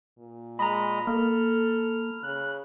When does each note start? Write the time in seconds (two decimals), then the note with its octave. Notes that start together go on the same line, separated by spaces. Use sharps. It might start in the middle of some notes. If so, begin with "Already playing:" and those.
0.18 A#2
0.59 G#3 D#5 A#5 B5
1.07 A#3 A4 F6
2.23 C#3 F#6